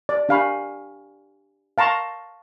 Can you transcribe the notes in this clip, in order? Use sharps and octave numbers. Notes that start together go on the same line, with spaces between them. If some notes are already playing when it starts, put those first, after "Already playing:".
D5
D4 G4 F5 G#5 B5 C#6
F5 A5 A#5 C6 C#6